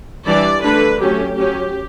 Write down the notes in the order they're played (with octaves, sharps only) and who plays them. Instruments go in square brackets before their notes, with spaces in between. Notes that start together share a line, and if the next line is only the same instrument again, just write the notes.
[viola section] E3 G3 D4 D5
D3 A3 D4 B4
F#3 A3 C#4 G4
F#3 C#4 G4